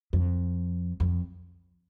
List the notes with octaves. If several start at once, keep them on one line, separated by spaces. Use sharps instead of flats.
F2
F2